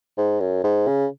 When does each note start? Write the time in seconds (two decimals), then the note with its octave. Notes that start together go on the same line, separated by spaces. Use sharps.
0.18 G#2
0.40 F#2
0.64 G#2
0.87 C#3